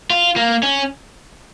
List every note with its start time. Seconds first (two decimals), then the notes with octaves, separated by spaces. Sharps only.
0.10 F4
0.36 A#3
0.63 C#4